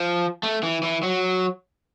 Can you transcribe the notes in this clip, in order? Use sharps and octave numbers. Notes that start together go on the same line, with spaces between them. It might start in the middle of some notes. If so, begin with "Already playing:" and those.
Already playing: F3
A3
E3
E3
F#3